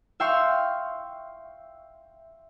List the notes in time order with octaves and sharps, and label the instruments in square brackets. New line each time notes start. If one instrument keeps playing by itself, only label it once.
[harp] E5 F5 G5 C6 C#6